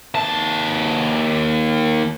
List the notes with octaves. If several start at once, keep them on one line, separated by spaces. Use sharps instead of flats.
D#2 A5